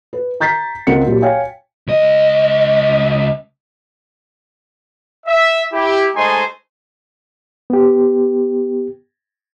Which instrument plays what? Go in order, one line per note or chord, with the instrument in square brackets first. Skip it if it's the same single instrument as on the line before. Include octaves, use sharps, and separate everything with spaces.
[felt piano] B4
A#5 G6 A6 B6 C7
C#2 C4 A#4 F#5 C#7
A#2 F#3 F4 G4
C#5 F5 G5 G#5
[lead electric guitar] C#2 D#5
[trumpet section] E5
E4 G4
G#3 A3 D#4 C5 G#5 C6
[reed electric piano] B3 G4